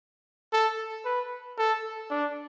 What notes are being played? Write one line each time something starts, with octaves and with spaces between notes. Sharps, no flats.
A4
B4
A4
D4